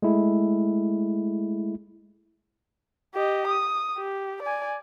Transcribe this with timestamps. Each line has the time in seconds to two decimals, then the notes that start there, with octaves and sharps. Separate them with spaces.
0.02 G#3 A3 E4
3.15 G4 D#5
3.47 D#6
3.97 G4
4.42 D5 G#5